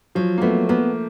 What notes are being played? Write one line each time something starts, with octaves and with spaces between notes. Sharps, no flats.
F3 F#3
A#3
A3 B3
A#3 B3